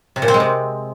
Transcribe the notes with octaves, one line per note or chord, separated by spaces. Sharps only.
C3
A#2
C4
G#3
C3